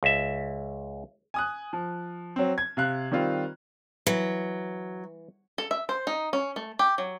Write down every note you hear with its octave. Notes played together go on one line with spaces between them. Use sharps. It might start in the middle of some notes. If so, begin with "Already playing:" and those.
C#2 E5
G#5 D#6 F#6
F3
F#3 C4
G#6
C3 F5 F#6
D#3 G3 C4 F4
E3 F#3
A4
E5
C5
D#4
C#4
A3
G4
F#3